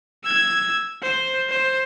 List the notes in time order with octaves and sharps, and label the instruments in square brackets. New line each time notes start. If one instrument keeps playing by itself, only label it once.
[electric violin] E6 G#6
C5
C5